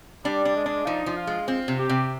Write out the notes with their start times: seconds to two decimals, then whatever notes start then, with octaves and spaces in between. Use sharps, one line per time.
0.25 G3 D4
0.45 D4
0.56 G#3
0.66 D4
0.86 F3 D#4
1.06 F3
1.17 F4
1.27 G#3
1.48 C4 F4
1.68 C3
1.78 G4
1.89 C3